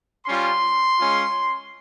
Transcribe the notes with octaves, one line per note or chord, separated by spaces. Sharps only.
G3 C#4 F4 C6
G#3 C#4 F4